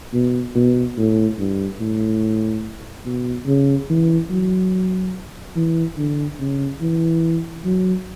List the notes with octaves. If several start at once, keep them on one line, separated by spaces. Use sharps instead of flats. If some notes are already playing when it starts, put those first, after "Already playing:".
B2
B2
A2
G2
A2
B2
C#3
E3
F#3
E3
D3
C#3
E3
F#3